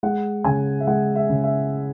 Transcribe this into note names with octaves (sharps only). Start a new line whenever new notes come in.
G#3 F#5
C#3 G#5
E5
G#3 F#5
E5
C#3
E5